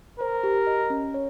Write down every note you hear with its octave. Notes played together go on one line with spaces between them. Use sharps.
A#4 C5
G4
D#5
C#4
C#5